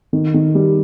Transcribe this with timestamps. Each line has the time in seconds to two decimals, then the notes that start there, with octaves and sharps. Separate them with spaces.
0.13 D#3
0.34 D#3
0.55 G3